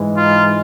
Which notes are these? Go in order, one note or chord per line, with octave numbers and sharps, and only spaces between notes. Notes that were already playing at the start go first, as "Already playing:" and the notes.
Already playing: G#2 E3 G#3
D#4 F4